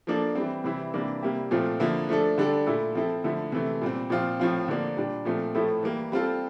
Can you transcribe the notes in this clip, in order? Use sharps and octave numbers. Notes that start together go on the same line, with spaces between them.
F3 A#3 D4 A4
E3 G3 C4
C3 E3 G3 C4 E4
C3 E3 G3 A#3 D4
C3 G3 A#3 E4 G4
A#2 F3 A3 C4 F4
D3 F3 A#3 E4
F3 A3 D4 A4
D3 G3 D4 A4
A#2 A3 E4 A4
F3 C4 E4 A4
D3 F3 A3 E4
C3 E3 A3
A#2 G3 C4
A#2 F3 C4 F4
A2 F3 C4 F4
D3 F3 A#3 D4
A#2 G3 D4
A#2 F3 A3 C4
A2 F3 A3 E4 A4
E3 G3 A#3
G3 C4 F4 A4